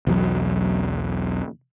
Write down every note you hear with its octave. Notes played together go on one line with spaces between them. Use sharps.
B1 E2 F#3